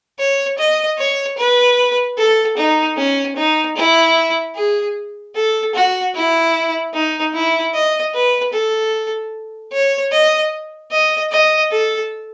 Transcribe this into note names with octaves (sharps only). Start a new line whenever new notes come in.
C#5
D#5
C#5
B4
A4
D#4
C#4
D#4
E4
G#4
A4
F#4
E4
D#4
E4
D#5
B4
A4
C#5
D#5
D#5
D#5
A4